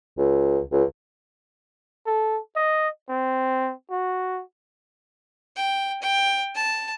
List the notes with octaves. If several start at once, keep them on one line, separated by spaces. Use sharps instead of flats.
C#2
C#2
A4
D#5
C4
F#4
G5
G5
A5